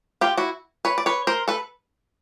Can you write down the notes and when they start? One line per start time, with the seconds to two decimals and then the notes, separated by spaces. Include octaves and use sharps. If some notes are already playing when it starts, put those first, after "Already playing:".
0.21 F4 G4
0.37 E4 F#4
0.85 B4 C#5
0.98 D5
1.06 B4 C#5
1.27 A#4 C5
1.48 A4 B4